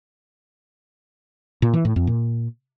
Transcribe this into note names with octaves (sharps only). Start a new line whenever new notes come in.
A#2
E3
A2
F2
A#2